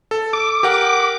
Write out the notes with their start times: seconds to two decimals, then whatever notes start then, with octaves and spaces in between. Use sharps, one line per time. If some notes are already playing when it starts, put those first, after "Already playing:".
0.11 A4
0.33 D6
0.63 G4 A#4 F#5